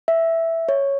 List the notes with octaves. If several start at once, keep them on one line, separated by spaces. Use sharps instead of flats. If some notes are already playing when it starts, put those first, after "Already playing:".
E5
C#5